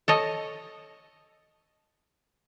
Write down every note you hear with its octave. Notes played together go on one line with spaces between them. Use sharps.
A4 C#5 D#5